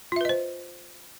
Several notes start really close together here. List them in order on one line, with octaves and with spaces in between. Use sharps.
F4 E5 B4 D#5 C5